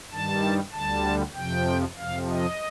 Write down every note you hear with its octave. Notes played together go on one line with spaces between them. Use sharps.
G2 D#3 G3 A5
D2 D3 G3 A5
F2 C3 F3 G5
F2 C3 F3 F5
D#5